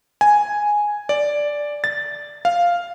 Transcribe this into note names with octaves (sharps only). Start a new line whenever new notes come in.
G#5
D5
A6
F5